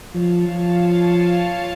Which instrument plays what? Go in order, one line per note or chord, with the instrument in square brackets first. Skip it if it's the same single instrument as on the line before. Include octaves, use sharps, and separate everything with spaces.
[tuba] F3 [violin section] F4 C#5 F5 A5
[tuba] F3